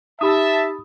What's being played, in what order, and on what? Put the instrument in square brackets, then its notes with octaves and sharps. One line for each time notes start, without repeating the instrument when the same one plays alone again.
[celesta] D#4 G4 [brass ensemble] E5 A5 [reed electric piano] B5 D#6